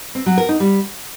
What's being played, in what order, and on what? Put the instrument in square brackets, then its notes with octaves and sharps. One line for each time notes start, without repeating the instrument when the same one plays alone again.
[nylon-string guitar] C4
F#3
A#4
D#4
G3